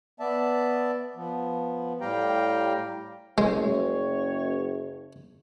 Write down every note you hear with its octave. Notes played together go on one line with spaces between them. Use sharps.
B3 D5 E5 A5
F3 B3
A2 G3 G4 F5 G5 A#5
F#1 G#3 C#5